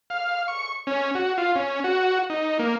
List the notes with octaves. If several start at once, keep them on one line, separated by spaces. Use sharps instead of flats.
F5
C#6
C#4
F#4
F4
C#4
F#4
D#4
A#3